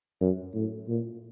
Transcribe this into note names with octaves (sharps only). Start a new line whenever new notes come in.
F#2
A2
A#2